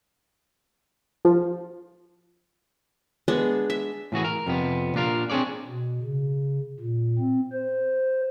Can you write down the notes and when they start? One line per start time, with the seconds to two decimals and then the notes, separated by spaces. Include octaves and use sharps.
1.25 F3
3.28 G#3 B3 D4
3.70 E5
4.12 A2 E3 F#4 G#4
4.24 A#4
4.47 F2 C3 B3
4.95 A#2 D4 F4 A#4
5.30 C4 D4 G#4 C#5 D5
5.67 B2
6.02 C#3
6.79 A#2
7.19 C4
7.53 C5